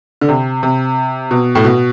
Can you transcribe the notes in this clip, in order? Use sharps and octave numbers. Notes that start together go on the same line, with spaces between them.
D3
C3
C3
B2
A2
B2